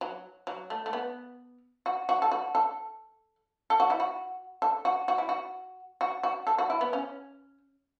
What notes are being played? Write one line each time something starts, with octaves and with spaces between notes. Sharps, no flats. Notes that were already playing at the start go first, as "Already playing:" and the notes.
F#3
F#3
A3
A3
B3
F#4
F#4
A4
F#4
A4
A4
F#4
E4
F#4
A4
F#4
F#4
E4
F#4
F#4
F#4
A4
F#4
E4
B3
C#4